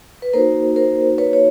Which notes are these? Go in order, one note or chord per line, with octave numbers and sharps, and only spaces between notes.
B4
A#3 D#4 F#4 A#4 C5
A#4 C5
B4 C#5
C#5